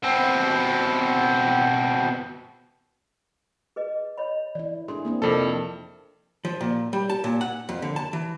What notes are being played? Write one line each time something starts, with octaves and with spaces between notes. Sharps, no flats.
B2 C4
G#4 B4 D#5
C#5 D#5 B5
E3 E4 D5
D4 E4 G#4 A4 C6
A#3 C4 D4
F2 C3 E4 A4 A#4 D5
F3
A#2
G3
A5
A#2
F#5
F2
D3
A5
E3